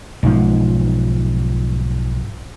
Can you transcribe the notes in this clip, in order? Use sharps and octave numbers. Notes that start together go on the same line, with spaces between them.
B1 G#2 F3